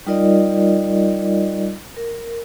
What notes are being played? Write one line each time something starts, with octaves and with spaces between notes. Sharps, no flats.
G3 D#4 F4 A#4 D5 D#5
A#4